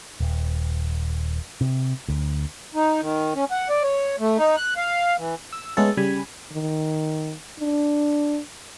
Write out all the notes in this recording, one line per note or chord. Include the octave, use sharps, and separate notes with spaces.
D#1
C3
D2
D#4
D#3
C#4
F#5
D5
C#5
A3
D#4
F#6
F5
E3
E6
G#3 A3 B3 C#4 A4
C#3 G3 G#5 B5
D#3
D4